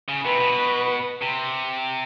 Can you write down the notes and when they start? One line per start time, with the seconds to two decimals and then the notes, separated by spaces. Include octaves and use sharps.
0.09 C#3
0.24 C3 B4
0.41 B2
1.22 C3